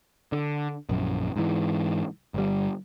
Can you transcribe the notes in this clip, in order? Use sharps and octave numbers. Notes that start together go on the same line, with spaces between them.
D3
A#1 F#2
G#2 E3
G1 G3